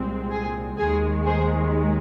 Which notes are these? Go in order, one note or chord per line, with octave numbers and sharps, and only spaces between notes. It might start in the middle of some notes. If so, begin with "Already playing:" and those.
Already playing: C2 A#2 G#3 C4
G#4
D#2 D#3 G#3 G#4
G#4 C5